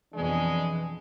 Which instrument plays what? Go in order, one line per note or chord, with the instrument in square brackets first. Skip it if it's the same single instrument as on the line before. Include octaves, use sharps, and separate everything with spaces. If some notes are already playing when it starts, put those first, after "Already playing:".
[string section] F2 B2 [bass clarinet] E3 [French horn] G#3 [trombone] D4